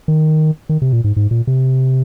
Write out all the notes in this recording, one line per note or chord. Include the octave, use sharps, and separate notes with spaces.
D#3
D#3
C3
A#2
G#2
G#2
A#2
C3